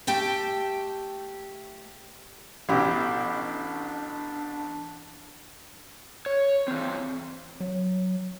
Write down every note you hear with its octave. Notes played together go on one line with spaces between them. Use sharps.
A3 G4 G5 A5
A1 B2 D4 E4 G4
C#5
E3 C4
F#3